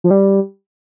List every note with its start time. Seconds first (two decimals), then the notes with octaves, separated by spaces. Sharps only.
0.04 F3
0.11 G3